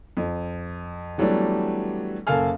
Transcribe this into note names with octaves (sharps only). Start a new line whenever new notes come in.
F2
E3 F#3 G3 A3 B3 D4
F#1 A#3 A4 F5 G#5 F6